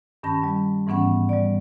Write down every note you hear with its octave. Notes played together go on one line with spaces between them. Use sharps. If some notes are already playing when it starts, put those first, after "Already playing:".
G2 D#3 C#4 A5 B5 A#6
G3
G#2 E3 B3 C#4 F#5
G3 D5